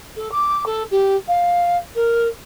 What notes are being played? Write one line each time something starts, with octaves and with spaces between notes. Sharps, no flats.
A4
D6
A4
G4
F5
A#4